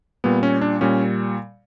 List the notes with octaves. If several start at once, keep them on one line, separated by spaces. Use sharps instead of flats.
A#2 G3 B3
C#4
D4
A#2 G3 C#4